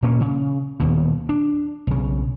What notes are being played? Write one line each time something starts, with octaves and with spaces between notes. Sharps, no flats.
A#2 A#3 C#4
C#3
D#1 D#2 B2
D4
B1 C#3